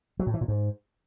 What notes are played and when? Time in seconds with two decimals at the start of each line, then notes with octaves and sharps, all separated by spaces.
0.19 F#3
0.27 A2
0.34 E3
0.41 A#2
0.48 G#2